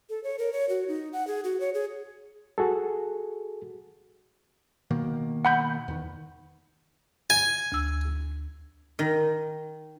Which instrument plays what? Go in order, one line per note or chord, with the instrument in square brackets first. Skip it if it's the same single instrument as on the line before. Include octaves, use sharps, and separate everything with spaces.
[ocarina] A4
C#5
A#4
C#5
F#4
D#4
F#5
G#4
F#4
C#5
G#4
[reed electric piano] F#4 G#4 A4
[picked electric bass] B2 D#3 A#3
[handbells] F#5 B5 G6
[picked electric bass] E2 D#3
[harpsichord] G#5
[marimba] D2 E6
[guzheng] D#3